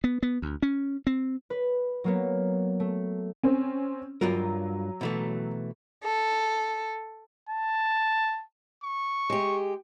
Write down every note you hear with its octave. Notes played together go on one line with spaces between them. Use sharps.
B3
B3
D2
C#4
C4
B4
F#3 A#3 B3
A3
C4 C#4
G2 F#3 F4 A#4
B2 E3 A3
A4
A5
C#6
G#3 G4